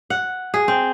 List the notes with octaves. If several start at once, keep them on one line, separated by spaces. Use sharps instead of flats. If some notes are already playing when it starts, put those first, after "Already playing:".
F#5
G#4
C4